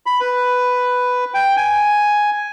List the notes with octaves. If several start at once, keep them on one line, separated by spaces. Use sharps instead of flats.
B5
B4
G5
G#5